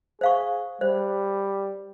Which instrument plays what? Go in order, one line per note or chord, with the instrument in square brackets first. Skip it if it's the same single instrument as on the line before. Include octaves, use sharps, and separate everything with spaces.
[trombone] G#4 [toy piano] C5 F5 C#6
[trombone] G3 [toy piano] C5